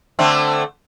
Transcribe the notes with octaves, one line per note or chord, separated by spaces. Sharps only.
D3 A3 C4